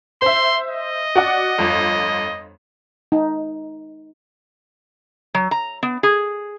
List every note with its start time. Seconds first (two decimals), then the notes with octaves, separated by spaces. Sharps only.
0.22 C5 E5 C6
0.70 D#5
1.15 F#4 D5 F#5
1.58 G1 F2
3.12 D#4
5.34 F#3
5.51 A#5
5.83 B3
6.03 G#4